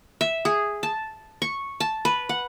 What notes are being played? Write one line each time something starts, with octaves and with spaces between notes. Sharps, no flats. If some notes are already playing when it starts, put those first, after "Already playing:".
E5
G#4
A5
C#6
A5
B4
F#5